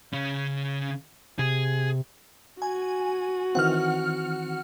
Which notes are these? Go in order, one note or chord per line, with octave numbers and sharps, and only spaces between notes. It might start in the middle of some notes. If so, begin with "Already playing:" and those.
C#3 C#4
C3 G#4
F#4 G#5
D#3 E3 C4 F#5 F6